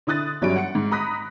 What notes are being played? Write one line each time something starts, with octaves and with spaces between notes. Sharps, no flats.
D3 E4 D#6 F#6 A6
G1 F#3 G3 C#4 D7
F#5 C#7
G#2
A#5 B5 D#6 F#6 A#6 B6